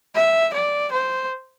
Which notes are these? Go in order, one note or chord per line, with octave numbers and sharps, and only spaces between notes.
E5
D5
C5